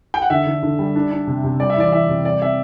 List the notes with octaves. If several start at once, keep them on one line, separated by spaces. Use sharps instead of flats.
G5
F#5
D3 E5
D3
D3
G3
D4
D4
C3
C3
G3 D5
E5
E3 D5
E3 E5
C3
G3 D5
C4 E5